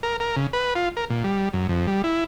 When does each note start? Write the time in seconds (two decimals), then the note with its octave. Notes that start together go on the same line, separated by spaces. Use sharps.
0.03 A#4
0.20 A#4
0.36 C#3
0.53 B4
0.75 F4
0.97 A#4
1.10 A#2
1.24 G3
1.53 F#2
1.69 F2
1.87 G3
2.04 E4